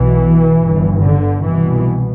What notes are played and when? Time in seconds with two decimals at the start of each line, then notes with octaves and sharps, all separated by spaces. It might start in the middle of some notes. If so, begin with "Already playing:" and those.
Already playing: B1 B2 E3
0.59 G1 G2
1.02 D3
1.43 C2 B2 E3